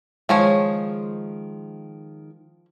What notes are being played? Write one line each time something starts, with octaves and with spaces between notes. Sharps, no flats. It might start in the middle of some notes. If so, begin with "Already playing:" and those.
D#3 F3 G#3 G#4 C#5